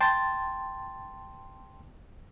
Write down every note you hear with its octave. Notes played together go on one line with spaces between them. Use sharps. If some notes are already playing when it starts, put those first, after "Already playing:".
G5 A5 C6 A6